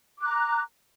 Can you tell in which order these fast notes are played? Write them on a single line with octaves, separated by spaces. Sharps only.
D6 F#6 A#5